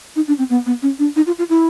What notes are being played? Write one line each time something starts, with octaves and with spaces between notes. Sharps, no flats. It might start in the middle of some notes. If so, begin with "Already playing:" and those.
D#4
D4
C4
B3
B3
C#4
D4
D#4
F4
F4
E4